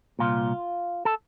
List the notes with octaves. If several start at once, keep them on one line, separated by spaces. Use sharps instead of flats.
C2 A#2 F4
A4